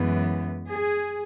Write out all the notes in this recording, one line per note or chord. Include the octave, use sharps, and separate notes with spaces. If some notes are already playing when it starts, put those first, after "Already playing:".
Already playing: F#2 E3 G#3 B3
G#4